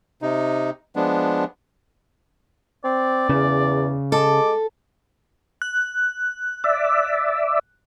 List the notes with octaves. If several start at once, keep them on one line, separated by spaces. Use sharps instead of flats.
C3 D#4
F3 G#3 B3 D4
C4 D5
E2 C#3
G#3 A4 D6
F#6
D5 E5